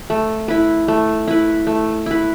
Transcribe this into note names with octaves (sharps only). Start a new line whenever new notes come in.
A3
E4 B4
A3
E4 B4
A3
E4 B4